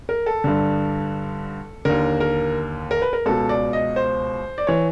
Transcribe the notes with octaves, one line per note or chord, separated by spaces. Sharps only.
A#4
A4
G2 D3
D#2 D3 A#4
A#4
A#4
B4
A#4
C#2 B2 A4
D5
D#5
C5
D5
E3 C#5